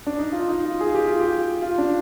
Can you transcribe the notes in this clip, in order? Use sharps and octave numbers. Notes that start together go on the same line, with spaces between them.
D4
D#4
F4
D#4
F4
G#4
G4
F4
G4
F4
D4